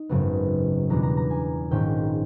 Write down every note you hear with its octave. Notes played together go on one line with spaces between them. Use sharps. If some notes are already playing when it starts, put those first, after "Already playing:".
Already playing: D#4
G#1 F#2 C#3 F#3 B3
E2 B2 G3 B3 D4 A#5
A#5
A#5
G#5
A#1 G#2 D#3 G#3 C#4 G5